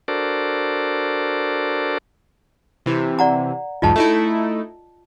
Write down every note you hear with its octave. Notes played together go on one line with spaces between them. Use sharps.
D4 F#4 A4 A#4 C5 D5
C3 E3
D5 F#5 A#5
B1 E2 G#2 F4 D#5 A5
A3 D#4 E4